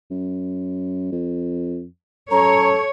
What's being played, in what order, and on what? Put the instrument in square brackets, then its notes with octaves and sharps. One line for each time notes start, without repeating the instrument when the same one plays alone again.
[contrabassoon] F#2
F2
[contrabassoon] F#2 [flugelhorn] A4 [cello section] C#5 [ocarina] A#5